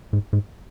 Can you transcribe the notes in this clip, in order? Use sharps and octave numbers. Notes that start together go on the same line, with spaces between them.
G#2
G#2